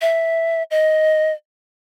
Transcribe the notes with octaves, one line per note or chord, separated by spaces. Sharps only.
E5
D#5